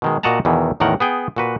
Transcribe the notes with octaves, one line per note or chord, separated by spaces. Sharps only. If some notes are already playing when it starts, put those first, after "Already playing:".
B2 D#3 G#3
A#2 F#4 D#5 F#5 A5 A#5
E2 B2 D#3 E3
E2 A2 D#3 A#4 F#5
B3 G#4 G5
A#2 F#4 B4